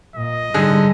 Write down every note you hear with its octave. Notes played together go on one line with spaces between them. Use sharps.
A#2 D#5
G#2 D3 G3 G#4